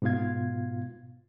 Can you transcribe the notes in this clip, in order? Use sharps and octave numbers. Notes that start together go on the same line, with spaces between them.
G#2 B2 B3 F4 F5 G#6